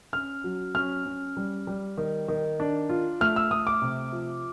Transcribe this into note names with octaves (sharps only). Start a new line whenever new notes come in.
C#4 F6
F#3
C#4 F6
C#4
G3
G3
D#3
D#3
D4
F4
A3 F6
E6
A3 D#6
D6
C3
F3